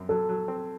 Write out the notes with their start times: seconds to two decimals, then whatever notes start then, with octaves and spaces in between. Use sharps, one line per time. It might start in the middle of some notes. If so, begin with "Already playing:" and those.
Already playing: F#2 C4
0.09 F#3 A4
0.29 F#3
0.48 C4